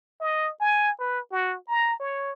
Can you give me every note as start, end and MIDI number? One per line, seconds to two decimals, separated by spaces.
0.20 0.51 75
0.60 0.91 80
1.00 1.19 71
1.31 1.56 66
1.68 1.99 82
2.00 2.32 73